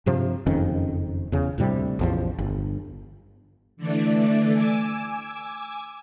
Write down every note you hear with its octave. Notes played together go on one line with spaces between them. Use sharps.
G2 C3 F3
F#1 F2 D#3 C#4
E2 C#3
D2 A2 C3 G3
A1 E2 F3
G1
D3 E3 A3 D5
G#5 D6 E6